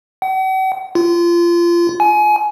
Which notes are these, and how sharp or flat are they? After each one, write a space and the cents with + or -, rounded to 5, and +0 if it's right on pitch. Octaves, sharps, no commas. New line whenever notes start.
F#5 +45
F4 -25
G#5 +25